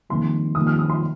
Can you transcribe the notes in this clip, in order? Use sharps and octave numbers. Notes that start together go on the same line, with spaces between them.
F2 D#3 G3 A#3 C6
F2 D#3 G3 A#3 D#6
F6
D#6
C6